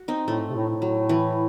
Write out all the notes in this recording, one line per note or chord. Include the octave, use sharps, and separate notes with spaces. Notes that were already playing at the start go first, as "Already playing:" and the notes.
Already playing: F#4
C4 D#4
A2 A3
G#2
C3
A2
A2
F#3
E3